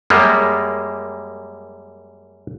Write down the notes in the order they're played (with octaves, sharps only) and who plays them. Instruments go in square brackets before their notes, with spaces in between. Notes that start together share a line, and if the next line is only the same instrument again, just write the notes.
[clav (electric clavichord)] F#2 G3 G#3 A#3